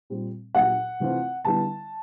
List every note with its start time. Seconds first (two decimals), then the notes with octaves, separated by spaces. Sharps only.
0.10 A#2 G3 C4
0.55 A#2 F#3 A#3 D4 G4 F#5
1.00 C3 E3 A3 C4 F4
1.45 D3 G3 B3 E4 A5